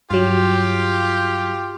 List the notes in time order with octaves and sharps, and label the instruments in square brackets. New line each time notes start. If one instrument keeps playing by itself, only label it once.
[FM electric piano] G2 F#3 [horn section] F4 G4